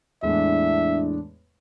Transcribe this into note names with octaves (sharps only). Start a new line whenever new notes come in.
E2 A2 G#3 D4 E5